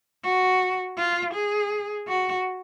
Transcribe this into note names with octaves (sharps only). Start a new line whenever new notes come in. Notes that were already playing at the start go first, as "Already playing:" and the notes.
F#4
F4
G#4
F#4